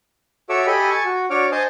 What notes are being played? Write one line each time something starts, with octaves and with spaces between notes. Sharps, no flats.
F#4 A4 C#5 E5 D6 E6
G4 A4 D#5 G#5 B5
G#5 A5 C#6
F#4
D4 F#4 C#5 D6 F6
C5 D#5 G#5 A5 D#6